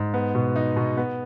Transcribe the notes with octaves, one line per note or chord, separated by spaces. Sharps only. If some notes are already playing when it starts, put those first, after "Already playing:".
Already playing: G#2
B3
B2
D#4
B2
B3